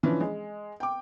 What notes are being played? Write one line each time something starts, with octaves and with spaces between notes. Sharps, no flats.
E3 F3 C#4 D4
G#3
G5 D6